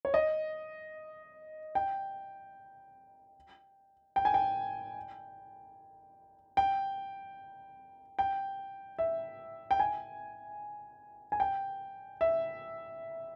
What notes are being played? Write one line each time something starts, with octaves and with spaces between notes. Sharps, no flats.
C#5
D#5
G5
G5
G#5
G5
G5
G5
E5
G5
G#5
G#5
G5
E5